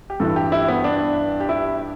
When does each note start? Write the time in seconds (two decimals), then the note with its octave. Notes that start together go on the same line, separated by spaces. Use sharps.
0.10 G4
0.20 G2 E3 A4
0.36 G4
0.52 E4
0.68 B3
0.84 D4
1.40 G4
1.49 E4